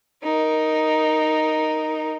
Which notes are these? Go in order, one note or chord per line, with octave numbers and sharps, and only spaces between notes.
D#4 A#4